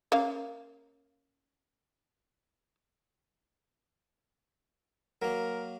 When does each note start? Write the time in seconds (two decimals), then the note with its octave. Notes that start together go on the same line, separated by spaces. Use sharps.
0.12 A#3 C#4 F5
5.22 F#3 A#3 A#4